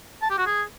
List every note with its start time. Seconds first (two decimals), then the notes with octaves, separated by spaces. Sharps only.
0.22 A5
0.30 G4
0.38 F#4
0.46 G#4